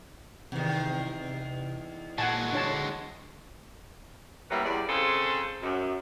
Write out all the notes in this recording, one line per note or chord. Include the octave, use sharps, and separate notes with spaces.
E2 C3 D#3
A#2 G#3 F#4 F#5 G#5 A5
D3 D4 C#5 A5
G3 A#3 B3 C#4 E4 E5
E2 G3 D5
C#3 C4 F4 G#4 A4 C5
F#2